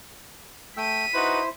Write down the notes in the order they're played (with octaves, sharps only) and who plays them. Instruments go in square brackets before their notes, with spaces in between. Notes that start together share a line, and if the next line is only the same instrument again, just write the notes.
[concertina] A3 G5 E6 [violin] B6 D#7
[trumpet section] D#4 F#4 B4 [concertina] E4 C5